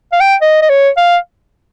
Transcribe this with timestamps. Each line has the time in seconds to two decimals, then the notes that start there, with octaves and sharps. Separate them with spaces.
0.12 F5
0.20 G5
0.41 D#5
0.62 D#5
0.69 C#5
0.97 F5